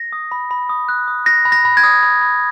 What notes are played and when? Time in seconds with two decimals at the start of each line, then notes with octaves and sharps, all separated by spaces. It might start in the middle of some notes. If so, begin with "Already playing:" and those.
Already playing: A#6
0.13 D#6
0.32 B5
0.51 B5
0.69 D#6
0.89 F#6
1.08 D#6
1.26 F#6 A#6
1.45 B5
1.52 A#6
1.65 B5
1.77 G#6
1.84 D#6
2.03 B5
2.22 B5